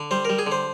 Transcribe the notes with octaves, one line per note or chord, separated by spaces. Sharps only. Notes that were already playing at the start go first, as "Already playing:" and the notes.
Already playing: D3
G3 C5
G3 A#4
G#4
D3 C5